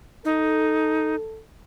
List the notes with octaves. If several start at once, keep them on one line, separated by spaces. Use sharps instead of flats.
D#4 A4